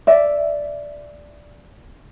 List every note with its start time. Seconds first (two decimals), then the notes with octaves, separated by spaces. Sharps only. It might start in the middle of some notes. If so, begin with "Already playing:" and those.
0.07 D5 E5